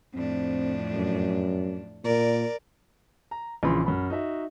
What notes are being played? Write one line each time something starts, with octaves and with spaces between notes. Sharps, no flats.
F2 A2 C4 D4
F#2
A#2 A#4 D5
A#5
A#1 C#3 E3 F3 B5 C6
F#2 B5
D#4 F#4 E5